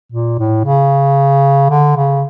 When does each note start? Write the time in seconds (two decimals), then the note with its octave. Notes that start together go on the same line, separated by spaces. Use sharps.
0.12 A#2
0.39 A2
0.65 C#3
1.70 D3
1.96 C#3